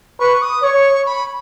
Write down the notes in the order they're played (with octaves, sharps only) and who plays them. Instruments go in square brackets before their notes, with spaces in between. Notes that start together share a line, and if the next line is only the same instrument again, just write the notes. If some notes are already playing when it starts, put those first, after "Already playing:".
[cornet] B4 [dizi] C#6
[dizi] D#6
[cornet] C#5 [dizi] C#6
[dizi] B5